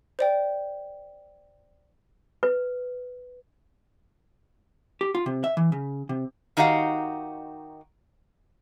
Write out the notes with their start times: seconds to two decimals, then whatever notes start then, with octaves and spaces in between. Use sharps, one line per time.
0.19 C5 D5 G5
2.43 B4
5.01 G4
5.15 F4
5.26 C3
5.44 E5
5.57 E3
5.72 C#3
6.09 C3
6.57 D#3 D#4 F#4 G4 F5 F#5